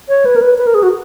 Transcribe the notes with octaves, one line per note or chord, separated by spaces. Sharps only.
C#5
B4
A#4
B4
B4
A#4
G#4
F#4